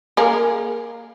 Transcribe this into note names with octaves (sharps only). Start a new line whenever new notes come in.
A#3 G#4 A#4